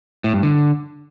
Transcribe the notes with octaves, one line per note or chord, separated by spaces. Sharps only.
A2
G2
D3